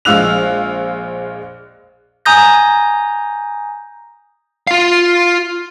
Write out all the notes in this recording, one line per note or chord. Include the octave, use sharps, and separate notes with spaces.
A#1 G#3 F5 E6 F#6 F7
G#5 A#5 D#6 G6 A#6
F4 F5